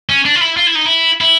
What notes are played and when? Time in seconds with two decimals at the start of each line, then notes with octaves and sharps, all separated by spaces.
0.09 C#4
0.25 D4
0.36 F4
0.41 E4
0.57 F4
0.67 E4
0.75 D#4
0.86 E4
1.21 E4